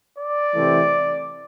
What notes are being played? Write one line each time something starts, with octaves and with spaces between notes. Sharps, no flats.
D5
C3 E3 A3 C4